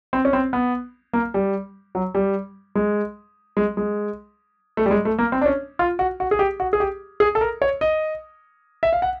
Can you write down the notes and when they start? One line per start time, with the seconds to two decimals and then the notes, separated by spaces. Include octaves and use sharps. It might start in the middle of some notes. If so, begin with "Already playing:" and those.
0.13 C4
0.25 C#4
0.33 C4
0.53 B3
1.13 A#3
1.34 G3
1.95 F#3
2.15 G3
2.75 G#3
3.57 G#3
3.77 G#3
4.77 A3
4.86 G3
4.91 G#3
5.05 A3
5.19 A#3
5.32 C4
5.41 D4
5.46 C#4
5.79 F4
5.99 F#4
6.20 F#4
6.31 G#4
6.39 G4
6.60 F#4
6.73 G#4
6.80 G4
7.20 G#4
7.35 A4
7.41 A#4
7.62 C#5
7.81 D#5
8.83 E5
8.93 F5
9.02 F#5